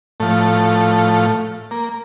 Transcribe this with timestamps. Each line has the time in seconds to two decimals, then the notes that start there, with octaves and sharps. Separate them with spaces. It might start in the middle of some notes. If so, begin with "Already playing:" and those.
0.20 A2 F3 A3
1.71 A#3